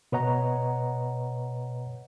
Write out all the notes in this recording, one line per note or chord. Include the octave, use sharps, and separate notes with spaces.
B2 B4 C#5 D#5 F#5 A#5